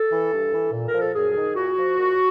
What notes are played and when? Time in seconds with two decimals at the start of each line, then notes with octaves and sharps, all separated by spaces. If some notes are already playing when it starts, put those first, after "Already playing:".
Already playing: A4
0.12 E3
0.33 G2
0.54 E3
0.73 A#2
0.88 A#4
0.94 F3
1.01 A4
1.15 F#2 G#4
1.36 D#3
1.56 A#2 F#4
1.77 F3
1.98 A#2